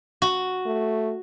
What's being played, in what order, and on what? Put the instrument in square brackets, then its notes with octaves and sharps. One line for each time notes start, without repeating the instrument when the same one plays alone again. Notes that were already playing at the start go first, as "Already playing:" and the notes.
[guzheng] F#4
[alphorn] A3